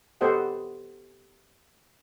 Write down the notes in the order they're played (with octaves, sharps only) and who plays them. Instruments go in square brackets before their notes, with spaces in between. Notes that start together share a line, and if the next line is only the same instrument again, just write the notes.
[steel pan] B3 G4 A4 C5 D#5 F#5